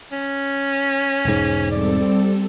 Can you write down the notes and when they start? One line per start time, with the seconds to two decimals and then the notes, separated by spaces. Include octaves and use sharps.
0.12 C#4
1.25 E1 G#2
1.71 G3 C4 A4 D5